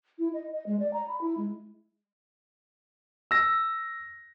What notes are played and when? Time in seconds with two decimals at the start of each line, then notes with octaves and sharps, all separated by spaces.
0.19 E4
0.34 D#5
0.53 D#5
0.66 G#3
0.79 D5
0.93 A#5
1.08 B5
1.21 E4
1.37 G#3
3.31 E6 A#6